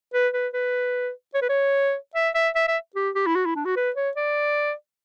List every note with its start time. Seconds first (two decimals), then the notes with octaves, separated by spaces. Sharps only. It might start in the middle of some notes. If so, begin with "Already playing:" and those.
0.14 B4
0.34 B4
0.53 B4
1.35 C#5
1.42 B4
1.49 C#5
2.15 E5
2.35 E5
2.55 E5
2.68 E5
2.96 G4
3.15 G4
3.27 E4
3.36 F#4
3.46 E4
3.56 D4
3.65 F#4
3.76 B4
3.96 C#5
4.16 D5